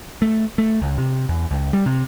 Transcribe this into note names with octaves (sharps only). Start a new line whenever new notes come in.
A3
A3
C#2
C3
E2
C#2
G3
C3